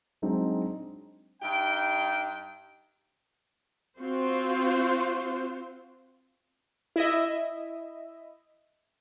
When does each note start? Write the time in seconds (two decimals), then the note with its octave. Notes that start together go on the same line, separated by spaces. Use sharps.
0.22 F#3 G#3 C4 D4 D#4
1.42 G2 D#4 G5
3.99 C4 F4 F#4 C5
6.96 E4 D#5 E5